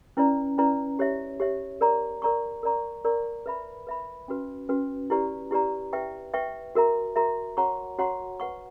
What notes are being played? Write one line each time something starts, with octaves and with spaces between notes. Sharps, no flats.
C#4 E4 B4 D5 A#5
C#4 E4 B4 D5 A#5
G4 C#5 E5
G4 C#5 E5
A#4 D5 A#5 C#6
A#4 D5 A#5 C#6
A#4 D5 A#5 C#6
A#4 D5 A#5 C#6
B4 E5 B5
B4 E5 B5
C#4 F#4 B4
C#4 F#4 B4
E4 G4 B4 D5 A#5
E4 G4 B4 D5 A#5
B4 E5 G5 C#6
B4 E5 G5 C#6
F#4 A#4 E5 A#5
F#4 A#4 E5 A#5
F#4 C#5 F#5 A#5 C#6
F#4 C#5 F#5 A#5 C#6
B4 F#5 C#6